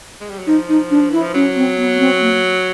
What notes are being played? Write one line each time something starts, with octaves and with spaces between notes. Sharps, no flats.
G#3
G3
F#3
F3 D#4
D#4
D4
E3 E4
F3
F#3 C#4
C4
B3
B3
C4
A#3